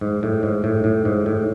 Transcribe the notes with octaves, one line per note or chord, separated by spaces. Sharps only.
G#2
A2
G#2
A2
A2
G#2
A2